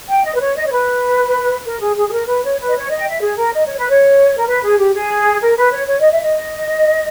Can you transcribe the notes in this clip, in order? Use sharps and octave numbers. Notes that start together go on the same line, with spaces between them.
G5
D#5
B4
C#5
D#5
C#5
B4
A#4
G#4
G#4
G#4
A#4
B4
C#5
B4
D#5
C#5
D#5
G5
E5
G#4
A#4
D#5
C#5
B4
C#5
A#4
B4
G#4
G4
G#4
A#4
B4
C#5
C#5
D#5
E5
D#5